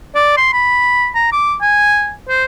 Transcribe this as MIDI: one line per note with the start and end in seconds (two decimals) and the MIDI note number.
0.15 0.33 74
0.37 0.51 84
0.53 1.09 83
1.15 1.27 82
1.32 1.56 86
1.61 2.12 80
2.29 2.45 72